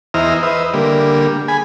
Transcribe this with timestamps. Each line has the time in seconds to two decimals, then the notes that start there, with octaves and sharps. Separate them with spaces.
0.14 E2 E4 C5 D#5 A#5 F6
0.43 B4 C5 D#5 E5
0.74 D3 G3 A#3
1.48 G#4 G#5 B5